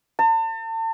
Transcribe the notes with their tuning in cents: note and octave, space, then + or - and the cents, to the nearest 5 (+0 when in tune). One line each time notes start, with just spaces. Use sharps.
A5 +40